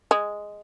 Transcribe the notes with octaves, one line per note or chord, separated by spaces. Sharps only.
G#3